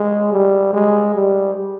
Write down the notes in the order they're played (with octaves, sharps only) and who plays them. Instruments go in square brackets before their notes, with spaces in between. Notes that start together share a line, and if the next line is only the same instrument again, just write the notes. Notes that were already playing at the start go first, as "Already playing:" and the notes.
Already playing: [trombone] G#3
G3
G#3
G3